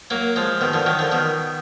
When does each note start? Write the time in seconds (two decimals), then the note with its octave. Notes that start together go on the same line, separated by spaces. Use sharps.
0.10 F#3 A#3
0.36 F3 G#3
0.61 B2 D#3
0.73 D3 F3
0.86 D#3 F#3
0.99 D3 F3
1.12 B2 D#3